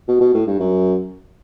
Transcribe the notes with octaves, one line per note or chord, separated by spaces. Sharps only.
B2
B2
A2
G2
F#2